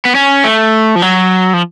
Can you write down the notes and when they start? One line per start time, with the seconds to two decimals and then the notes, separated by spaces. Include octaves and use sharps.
0.05 B3
0.15 C#4
0.44 A3
0.96 F3
1.02 F#3
1.54 F3